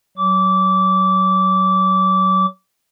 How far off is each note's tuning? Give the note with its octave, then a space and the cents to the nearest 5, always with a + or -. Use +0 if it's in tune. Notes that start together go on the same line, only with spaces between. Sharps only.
F#3 +20 D6 -20